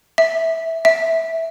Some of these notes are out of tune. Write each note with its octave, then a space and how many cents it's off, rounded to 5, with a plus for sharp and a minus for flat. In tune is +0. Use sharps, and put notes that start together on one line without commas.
E5 -10
E5 -10